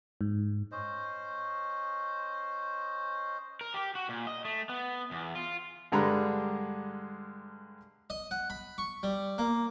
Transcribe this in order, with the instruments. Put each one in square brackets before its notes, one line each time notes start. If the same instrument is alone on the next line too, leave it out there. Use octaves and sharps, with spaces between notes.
[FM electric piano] G#2
[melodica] C#4 C5 D#5
[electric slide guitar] A#4
G4
F#4
A#2
D#5
A3
B3
E2
F4
[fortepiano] G2 D3 G3 G#3 A#5 B5
[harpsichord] D#5
F#5
B5
C#6
G3
A#3